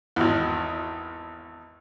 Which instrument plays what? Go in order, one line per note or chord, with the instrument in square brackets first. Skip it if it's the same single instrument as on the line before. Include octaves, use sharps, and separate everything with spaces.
[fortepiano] G#1 E2